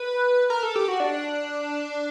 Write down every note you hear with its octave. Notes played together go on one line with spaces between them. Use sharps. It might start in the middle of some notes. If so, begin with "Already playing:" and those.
Already playing: B4
A#4
A4
G4
F#4
D4